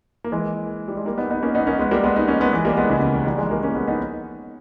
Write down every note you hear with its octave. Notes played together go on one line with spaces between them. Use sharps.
A#3
E3 G#3
G3
G#3
G3 A#3
B3 D#4
B3 D#4
A#3 C#4
B3 D#4
A#3 C#4
G#3 B3
G3 A#3
G#3 B3
B3 D#4
A#3 C#4
G#3 B3
E3 G#3
G3 A#3
G#3 B3
C#3
C#3
D#3
D#3 G3
E3 G#3
G3 A#3
A#3 C#4
G#3 B3
B3 D#4